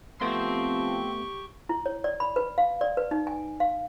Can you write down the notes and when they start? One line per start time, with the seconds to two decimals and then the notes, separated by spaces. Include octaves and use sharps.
0.21 F3 A3 B3 C4 G4 C6 C#6
1.69 E4
1.86 C#5
2.04 D5
2.20 B5
2.36 B4
2.58 F5
2.81 D5
2.97 B4
3.11 D#4
3.27 G#5
3.60 F5